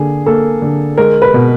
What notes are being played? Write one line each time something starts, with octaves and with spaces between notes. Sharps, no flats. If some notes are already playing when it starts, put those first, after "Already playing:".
Already playing: D3 A#3 G#4
A#3 A4
D3
G#3 A#4
B4
B2